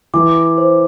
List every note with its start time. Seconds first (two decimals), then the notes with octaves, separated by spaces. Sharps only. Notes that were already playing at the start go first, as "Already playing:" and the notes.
0.14 E3 D6
0.58 C5